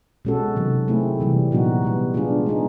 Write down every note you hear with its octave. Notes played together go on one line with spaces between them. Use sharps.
B2 G#3 C#4 F#4 A4
C3 D#3 F#3
A3 C4 E4 G#4
C3 E3 G3
A#2 F#3 B3 D#4 F#4
B2 G3 B3
G#3 B3 D4 F4 G#4
G#3 B3 D#4 G#4